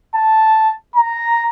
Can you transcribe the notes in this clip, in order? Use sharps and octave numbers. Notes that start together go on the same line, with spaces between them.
A5
A#5